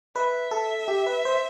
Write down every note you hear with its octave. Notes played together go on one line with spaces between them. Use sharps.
B4 E5
A4
G4
B4
C5